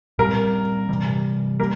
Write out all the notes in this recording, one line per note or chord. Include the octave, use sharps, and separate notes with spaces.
A#2 G3 C4 A#4
C3 E3 G3
G3 A#3 A#4